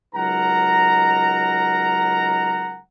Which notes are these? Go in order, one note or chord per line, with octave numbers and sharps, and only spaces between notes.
C#2 F#3 D#4 A#4 F#5 A#5